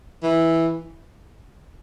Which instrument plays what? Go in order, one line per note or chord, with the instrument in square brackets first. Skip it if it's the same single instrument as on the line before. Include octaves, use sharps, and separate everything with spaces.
[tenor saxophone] E3